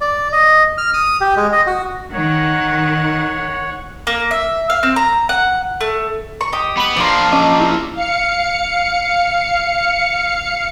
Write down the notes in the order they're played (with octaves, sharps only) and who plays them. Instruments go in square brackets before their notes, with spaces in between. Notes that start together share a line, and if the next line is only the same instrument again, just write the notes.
[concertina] D5
D#5
F6
D#6
G4
G#3
D#5
F#4
[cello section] D#3 [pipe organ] C#5 [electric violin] F#5
[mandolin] A#3
E5
F5
C4
A#5
F#5
A3
C#6
G4 D#5
[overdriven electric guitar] B3 [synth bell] B5 F#7
[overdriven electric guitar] F3 A#3 [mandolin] D4 C6
[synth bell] C#4 D#5 D6
E4
[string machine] F5 C#7